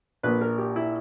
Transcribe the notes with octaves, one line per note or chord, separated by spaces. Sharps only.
A#1 A#2 A#3 B4
A#4
G4
E4